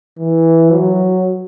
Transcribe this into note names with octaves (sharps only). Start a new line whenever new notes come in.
E3
F#3